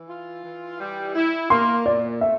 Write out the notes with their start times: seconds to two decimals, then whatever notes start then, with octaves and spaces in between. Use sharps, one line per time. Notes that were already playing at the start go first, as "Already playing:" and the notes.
Already playing: E3
0.09 F4
0.45 E3
0.79 G3
1.15 E4
1.50 A#3 C6
1.86 A#2 D5
2.21 A3 E5